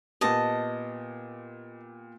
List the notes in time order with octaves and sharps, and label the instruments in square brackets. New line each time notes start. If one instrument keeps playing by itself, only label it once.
[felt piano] A#2 B3 G4 [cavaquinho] D#5 A5